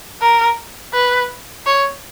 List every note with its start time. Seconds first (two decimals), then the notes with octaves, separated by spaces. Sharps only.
0.22 A#4
0.94 B4
1.67 C#5